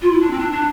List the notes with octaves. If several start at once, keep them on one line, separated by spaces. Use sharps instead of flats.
F4
E4
D4
C4
D4
D4